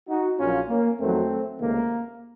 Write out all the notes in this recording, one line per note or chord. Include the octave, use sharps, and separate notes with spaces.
D#4 F#4
A#1 A#2 F#3 C#4 F4
A#3 C#4
F2 D#3 F#3 A3 C4
C#2 C3 D#3 A3 A#3